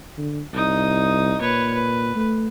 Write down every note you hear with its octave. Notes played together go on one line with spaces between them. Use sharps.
D3
C2 D#4 D#6
A#2 B4 C#5
B4
A3